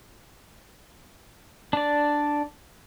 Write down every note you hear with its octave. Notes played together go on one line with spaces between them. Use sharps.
D4 D5